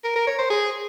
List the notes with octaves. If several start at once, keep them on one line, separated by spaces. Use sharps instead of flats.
A#4
A#4
C#5
C5
G#4